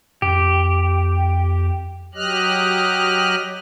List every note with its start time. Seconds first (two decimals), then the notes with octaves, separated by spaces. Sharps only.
0.22 F2 G4
2.15 F#3 G4 D#5 F6 F#6